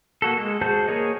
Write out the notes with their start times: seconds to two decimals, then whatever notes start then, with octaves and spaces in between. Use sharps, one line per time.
0.22 A#3 F#4 A4
0.37 G#3
0.61 F#4 G#4 C5 A5 G6
0.88 A#3 G#4 A#4 C#5 D#5